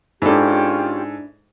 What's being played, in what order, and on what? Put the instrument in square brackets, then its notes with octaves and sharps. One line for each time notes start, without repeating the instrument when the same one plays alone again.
[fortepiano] G#2 A4 [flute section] C#4 F4 G4 [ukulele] D4 E4